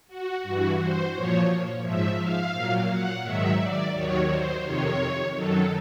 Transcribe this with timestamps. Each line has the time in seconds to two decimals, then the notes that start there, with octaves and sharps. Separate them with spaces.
0.08 F#4
0.43 G2 E3 F#4
0.78 C5
1.13 A#2 F3 C#5
1.83 G#2 F3 E5
2.18 F5
2.53 A#2 F#3
2.89 F#5
3.23 G#2 D#3 F#3 E5
3.59 D5
3.93 D#2 D#3 F#3 C#5
4.28 C5
4.64 F2 C3 D#3 C#5
5.33 F#2 D#3 F#3 A4